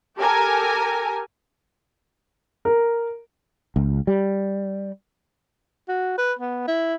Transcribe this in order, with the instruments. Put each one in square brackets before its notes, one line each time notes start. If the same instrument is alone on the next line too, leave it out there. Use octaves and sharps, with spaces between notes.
[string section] G4 A4 A#4 G#5
[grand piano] A#4
[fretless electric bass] C#2
G3
[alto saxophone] F#4
B4
B3
E4